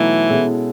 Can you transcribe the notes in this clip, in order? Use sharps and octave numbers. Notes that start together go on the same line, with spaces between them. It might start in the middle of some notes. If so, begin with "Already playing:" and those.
Already playing: B2 E3 F#3 A3 D#4
B2 G#3 C#4 E4 A4